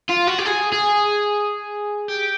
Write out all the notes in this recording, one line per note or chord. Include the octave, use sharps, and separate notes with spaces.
F4
F#4
G4
G#4
G#4
G4